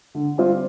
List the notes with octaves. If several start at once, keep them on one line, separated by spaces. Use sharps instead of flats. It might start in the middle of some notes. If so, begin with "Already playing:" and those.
D3
G3 C4 F4